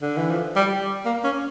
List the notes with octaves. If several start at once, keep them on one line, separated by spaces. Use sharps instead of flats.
D3
E3
F3
G3
A#3
C#4